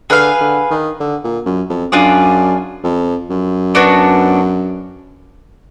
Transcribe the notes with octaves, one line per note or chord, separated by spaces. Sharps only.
D3 G#4 B4 F5
D3
D#3
D3
A#2
F#2
F2
F#2 D4 F4 G#4 D5
F2
F#2
B3 D4 F#4